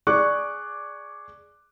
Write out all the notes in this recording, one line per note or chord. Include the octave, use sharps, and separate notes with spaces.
G#4 D5 C#6 D6 F#6